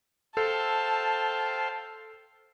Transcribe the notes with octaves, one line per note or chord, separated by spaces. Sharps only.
A4 C5 F5 G5 A5